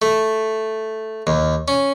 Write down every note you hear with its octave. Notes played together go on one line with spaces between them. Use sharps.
A3
D#2
C#4